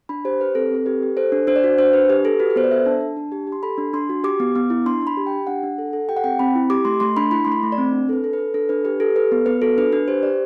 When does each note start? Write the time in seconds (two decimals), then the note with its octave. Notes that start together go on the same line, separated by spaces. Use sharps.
0.09 D4 B5
0.25 G4 C5
0.40 G4 B4
0.55 C4 A4
0.71 C4 A4
0.86 G4 B4
1.02 G4
1.17 A4 C5
1.32 D4
1.47 D4 C5
1.56 D5
1.64 F#4 C5
1.78 D4 C5
1.93 D4 B4
2.09 G4 B4
2.24 G4 A4
2.39 F#4 B4
2.50 B4
2.56 B3 C5
2.64 D5
2.71 A4 E5
2.86 D4 A5
3.01 D4
3.17 D4
3.32 G4
3.47 G4
3.52 C6
3.63 A4 B5
3.78 D4
3.93 D4 C6
4.09 F#4
4.24 G4 D6
4.40 B3
4.55 B3
4.70 E4
4.86 D4 C6
5.02 D4
5.07 B5
5.17 G4
5.27 G5
5.32 G4
5.47 D4 F#5
5.63 D4
5.78 A4
5.93 A4
6.09 G4 G5
6.17 F#5
6.24 C4 G5
6.39 C4 B5
6.55 E4
6.70 G4 D6
6.85 A3 C6
7.00 A3 C6
7.17 D4 B5
7.31 E4 B5
7.45 A3 C6
7.52 B5
7.63 A3
7.72 D5
7.78 C4
7.92 D4
8.09 D4 A4
8.13 B4
8.24 A4
8.33 B4
8.38 A4
8.54 D4 A4
8.69 D4 B4
8.85 G4 B4
9.00 G4 A4
9.16 A4 B4
9.32 B3
9.46 B3 B4
9.62 F#4 A4
9.77 D4 B4
9.92 D4 B4
10.08 G4 C5
10.23 G4 D5